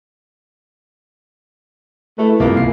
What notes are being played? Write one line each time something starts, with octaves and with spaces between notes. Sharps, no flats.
A3 E4 A4 B4
C2 A#3 F4
E3 C7